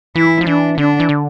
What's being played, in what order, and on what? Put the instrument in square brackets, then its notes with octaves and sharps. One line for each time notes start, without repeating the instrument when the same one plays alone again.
[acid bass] E3 [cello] E4
[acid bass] F3
[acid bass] E3 [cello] D4
[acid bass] D3 [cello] D4
[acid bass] E3
D3